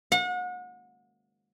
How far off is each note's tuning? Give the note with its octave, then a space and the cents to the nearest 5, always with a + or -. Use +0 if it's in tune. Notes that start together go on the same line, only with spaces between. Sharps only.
F#5 -35